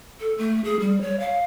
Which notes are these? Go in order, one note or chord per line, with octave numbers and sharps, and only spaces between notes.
A4
A3
G#4
G3
C#5
F5